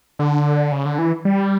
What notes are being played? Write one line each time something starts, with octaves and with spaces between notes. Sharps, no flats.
D3
C#3
D3
E3
G3